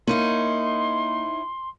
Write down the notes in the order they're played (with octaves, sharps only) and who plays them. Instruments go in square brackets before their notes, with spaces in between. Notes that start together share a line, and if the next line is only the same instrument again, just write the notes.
[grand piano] A#3 [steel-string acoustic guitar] C#4 D#4 E4 [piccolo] C6